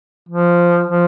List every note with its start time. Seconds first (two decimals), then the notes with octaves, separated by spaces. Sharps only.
0.29 F3
0.88 F3